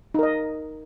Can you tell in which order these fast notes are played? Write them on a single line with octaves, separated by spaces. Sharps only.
D#4 A#4 D#5